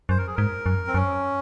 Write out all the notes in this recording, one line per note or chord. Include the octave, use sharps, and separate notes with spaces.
F#2 C5
A#4
G#4
G#2 A#4
F#2
C4
F#2 C#4